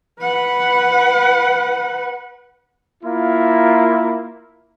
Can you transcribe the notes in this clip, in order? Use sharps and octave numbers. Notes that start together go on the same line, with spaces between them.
B4 F#5
A#3 E4 F4